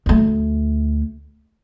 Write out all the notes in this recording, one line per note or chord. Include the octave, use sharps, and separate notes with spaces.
D2 A3